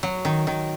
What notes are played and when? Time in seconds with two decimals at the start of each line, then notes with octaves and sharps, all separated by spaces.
0.03 F#3
0.25 D#3
0.47 D#3